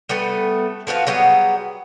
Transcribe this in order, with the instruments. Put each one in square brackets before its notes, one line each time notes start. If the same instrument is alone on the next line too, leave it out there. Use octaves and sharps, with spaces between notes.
[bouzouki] G3 A3 B3
F3 B3 F#4 F5
F#3 G3 B3 G#4